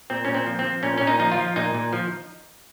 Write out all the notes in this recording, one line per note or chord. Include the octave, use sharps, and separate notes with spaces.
A#2 C4
A#2 C#4
C4
F3
C4
F3
A#2 C#4
A#2 C#4
D#4
F3 D#4
F4
F3
A#2 D#4
A#2
F3